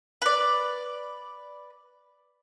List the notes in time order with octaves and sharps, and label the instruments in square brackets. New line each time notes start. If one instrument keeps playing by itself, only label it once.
[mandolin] B4 D5